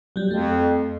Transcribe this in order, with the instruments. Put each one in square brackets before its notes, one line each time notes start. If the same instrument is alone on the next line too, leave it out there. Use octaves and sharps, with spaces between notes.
[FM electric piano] F#3 G3
[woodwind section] F2 [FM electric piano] A3